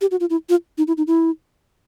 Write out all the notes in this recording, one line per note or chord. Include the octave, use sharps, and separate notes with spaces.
G4
F#4
F4
E4
F4
D#4
E4
D#4
E4